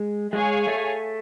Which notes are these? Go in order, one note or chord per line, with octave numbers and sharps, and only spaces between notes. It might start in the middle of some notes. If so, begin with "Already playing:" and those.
Already playing: G#3
G#3 G#4 C#5 F5 G#5
A3